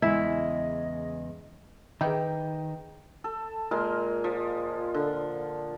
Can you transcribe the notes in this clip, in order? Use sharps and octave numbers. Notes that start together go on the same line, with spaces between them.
E2 C#3 G#3 E4 D#5
D#3 D#4 E4 G4 G#4 B4 D#5 G5
A4
A#2 G#3 A#4 C6
F3
D3